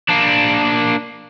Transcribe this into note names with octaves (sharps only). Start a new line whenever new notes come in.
A#3 D4